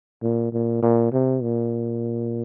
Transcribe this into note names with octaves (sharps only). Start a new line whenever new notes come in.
A#2
A#2
A#2
C3
A#2